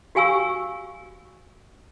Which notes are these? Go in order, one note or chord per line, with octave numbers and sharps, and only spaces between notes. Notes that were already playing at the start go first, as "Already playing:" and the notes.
F#4 G4 F5 G#5 C#6 E6